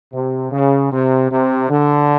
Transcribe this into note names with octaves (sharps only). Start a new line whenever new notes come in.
C3
C#3
C3
C3
D3